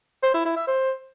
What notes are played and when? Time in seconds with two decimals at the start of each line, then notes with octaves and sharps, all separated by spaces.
0.23 C5
0.34 E4
0.45 E4
0.56 E5
0.68 C5